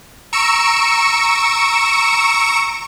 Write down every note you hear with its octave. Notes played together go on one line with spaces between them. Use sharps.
A#5 C#6 E6 C#7 D7 E7